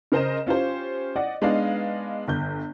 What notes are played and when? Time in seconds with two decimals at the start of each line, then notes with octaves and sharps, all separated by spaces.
0.12 C#3 A#4 C5 D#5 E7
0.47 C#4 F4 G4 C5
1.16 D5 D#5 F#5
1.42 G#3 B3 D4 D#4 D#5 F5
2.28 G1 G6